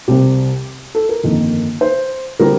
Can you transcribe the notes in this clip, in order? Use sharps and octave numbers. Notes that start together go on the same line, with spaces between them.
C2 C3 G3 C4 G4
A4
A#4
G1 F2 D#3 A#3
C5
D3 G3 C4 A#4